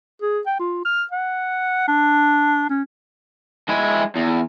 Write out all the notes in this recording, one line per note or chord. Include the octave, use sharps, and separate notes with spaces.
G#4
G5
F4
F6
F#5
D4
C#4
G#3 E4
E2